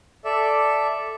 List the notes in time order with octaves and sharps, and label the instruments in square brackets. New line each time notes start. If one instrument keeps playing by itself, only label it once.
[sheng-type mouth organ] A4 D5 E5